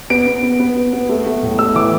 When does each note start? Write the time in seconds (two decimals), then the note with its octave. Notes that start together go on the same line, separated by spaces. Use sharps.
0.10 B3 D7
0.27 B3
0.43 B3
0.60 B3
0.77 B3
0.93 B3
1.09 A3
1.26 A3
1.43 A2
1.59 A3 E6
1.75 E3 D6